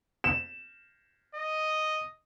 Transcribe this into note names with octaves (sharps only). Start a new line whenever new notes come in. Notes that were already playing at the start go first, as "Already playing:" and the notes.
E7
D#5